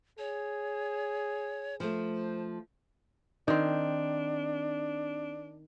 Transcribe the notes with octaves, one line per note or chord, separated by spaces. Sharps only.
G#4 C#5
F3 A3 C5
D#3 C4 D4